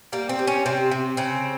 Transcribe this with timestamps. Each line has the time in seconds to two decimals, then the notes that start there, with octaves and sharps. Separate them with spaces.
0.12 G3 A#3
0.29 C4
0.39 G3
0.47 C#4
0.66 C3 C4
0.91 C3
1.17 C#3 C4